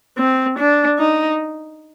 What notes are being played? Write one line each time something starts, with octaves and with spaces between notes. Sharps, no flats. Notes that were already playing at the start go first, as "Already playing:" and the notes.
C4
D4
D#4